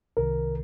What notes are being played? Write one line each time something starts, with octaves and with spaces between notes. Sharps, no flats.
C2 C3 D#3 A#4